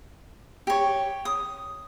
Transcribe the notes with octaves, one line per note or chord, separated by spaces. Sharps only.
G4 C#5
D#6